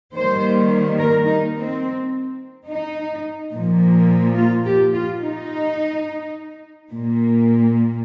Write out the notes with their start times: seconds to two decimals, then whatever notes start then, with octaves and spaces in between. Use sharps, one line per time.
0.15 D#3 G3 A#3 C5
0.99 A#4
1.27 D#4
1.56 C4
2.68 D#4
3.53 A#2 F3 A#3
4.36 F4
4.66 G4
4.94 F4
5.21 D#4
6.90 A#2 A#3